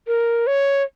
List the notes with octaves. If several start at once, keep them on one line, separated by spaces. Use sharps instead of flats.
A#4
C#5